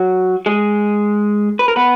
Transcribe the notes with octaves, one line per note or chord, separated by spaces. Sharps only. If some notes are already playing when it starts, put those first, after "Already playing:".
Already playing: F#3 F#4
G#3 G#4
B4
A#4
B3 B4